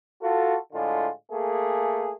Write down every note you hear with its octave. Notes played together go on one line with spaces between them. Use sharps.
F4 F#4 A4
A2 D3 G#3 F4
A3 A#3 G#4